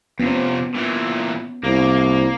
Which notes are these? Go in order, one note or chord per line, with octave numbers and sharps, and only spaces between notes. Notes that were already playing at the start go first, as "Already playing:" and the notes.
F2 C3 B3 C#4
A#2 E3
C2 A#3